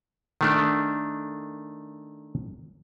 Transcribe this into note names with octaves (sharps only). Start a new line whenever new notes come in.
D#3 A3 D4